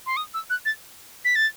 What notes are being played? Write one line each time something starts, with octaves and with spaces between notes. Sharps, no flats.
C6
D#6
E6
F#6
A6
B6
A6